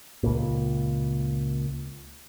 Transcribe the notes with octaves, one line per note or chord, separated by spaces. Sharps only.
C#2 A#2